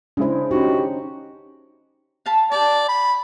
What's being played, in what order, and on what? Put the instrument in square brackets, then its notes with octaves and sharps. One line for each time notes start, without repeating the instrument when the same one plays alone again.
[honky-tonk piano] C#3 G#3 E4 [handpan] D4 C5
[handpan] C#4 D#4 [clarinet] F#4 [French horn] G4
[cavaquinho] F5 A5 B5
[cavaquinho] G4 A5 [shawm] D5
[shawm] B5